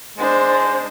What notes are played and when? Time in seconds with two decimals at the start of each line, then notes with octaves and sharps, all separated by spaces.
0.18 G#3 D4 C5